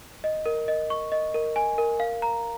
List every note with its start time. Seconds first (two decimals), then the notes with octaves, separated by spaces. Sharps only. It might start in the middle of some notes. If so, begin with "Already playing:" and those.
0.24 D#5
0.46 A#4
0.68 D#5
0.90 C#6
1.12 D#5
1.34 A#4
1.56 G#5
1.78 A#4
2.00 F5
2.22 A#5